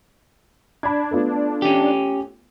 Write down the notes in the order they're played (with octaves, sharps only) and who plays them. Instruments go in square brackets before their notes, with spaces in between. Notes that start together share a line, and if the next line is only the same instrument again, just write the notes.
[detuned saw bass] D4 [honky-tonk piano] B5 G#6
[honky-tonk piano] A3 B3 F4
[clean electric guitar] C#4 G4